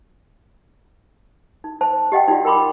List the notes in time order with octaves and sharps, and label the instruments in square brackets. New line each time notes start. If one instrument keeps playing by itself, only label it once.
[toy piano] D#4
C5 A5
G4 D#5 F#5 G5
D#4 F4 F#4 D5
A#4 G5 B5 C6 D6